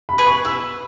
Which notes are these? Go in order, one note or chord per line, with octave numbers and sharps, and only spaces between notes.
B5
G#4 B4
C#6
E4 E6